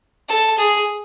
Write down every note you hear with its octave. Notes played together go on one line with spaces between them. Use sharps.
A4
G#4